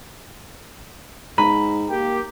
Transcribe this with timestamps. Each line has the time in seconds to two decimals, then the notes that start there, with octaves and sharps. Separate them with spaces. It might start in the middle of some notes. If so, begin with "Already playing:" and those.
1.38 G#2 A#5 B5
1.89 A#3 G4